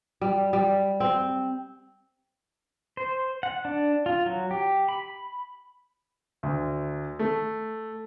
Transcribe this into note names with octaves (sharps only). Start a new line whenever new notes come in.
G3
G3
C4
C5
F#5
D4
F4
F#3
G4
B5
D2
A3